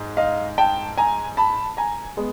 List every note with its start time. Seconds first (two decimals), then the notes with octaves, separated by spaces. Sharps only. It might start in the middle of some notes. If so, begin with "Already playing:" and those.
Already playing: G#2
0.17 D#5 F5
0.58 G5 A5
0.98 G#5 A#5
1.37 A5 B5
1.77 G#5 A#5
2.17 G#3 B3